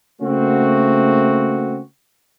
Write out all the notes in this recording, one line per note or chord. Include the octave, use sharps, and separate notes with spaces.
C#3 A3 A#3 C4 F#4